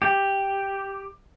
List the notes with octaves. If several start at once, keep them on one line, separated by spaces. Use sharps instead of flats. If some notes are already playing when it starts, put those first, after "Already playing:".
G4